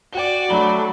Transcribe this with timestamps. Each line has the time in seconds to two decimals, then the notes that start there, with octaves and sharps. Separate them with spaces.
0.13 F#4 D5 G5 G7
0.50 F#3 A3 D4 A#5 B5 G7